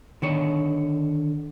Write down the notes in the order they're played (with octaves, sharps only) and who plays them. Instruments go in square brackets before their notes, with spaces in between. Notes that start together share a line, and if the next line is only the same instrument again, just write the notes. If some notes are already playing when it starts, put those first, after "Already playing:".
[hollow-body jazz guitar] D3 D#3 C#5